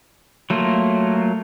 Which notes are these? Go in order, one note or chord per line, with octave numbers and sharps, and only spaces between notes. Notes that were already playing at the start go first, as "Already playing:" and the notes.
F#3 A3 A#3 F4